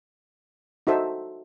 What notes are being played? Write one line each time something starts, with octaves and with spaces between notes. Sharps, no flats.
D#4 F#4 A4 C5 E5